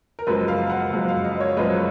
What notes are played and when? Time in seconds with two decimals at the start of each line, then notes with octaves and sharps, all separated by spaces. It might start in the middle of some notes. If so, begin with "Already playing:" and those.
0.19 A#4
0.27 F#1 F#2 F3 G#3 B4
0.48 F5
0.70 F#5
0.91 F#1 F#2 F3 G#3 F5
1.08 F5
1.24 D#5
1.40 C#5
1.57 F#1 F#2 F3 G#3 B4